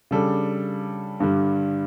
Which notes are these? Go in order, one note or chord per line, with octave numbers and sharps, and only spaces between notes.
C#3 G3 D4 A4
G2 D3 G3